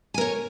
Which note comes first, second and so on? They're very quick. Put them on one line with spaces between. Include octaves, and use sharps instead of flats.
G#5 A#4 C#5